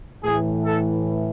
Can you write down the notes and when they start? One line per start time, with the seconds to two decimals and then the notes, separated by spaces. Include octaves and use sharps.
0.23 A2 E3 G#4
0.65 A4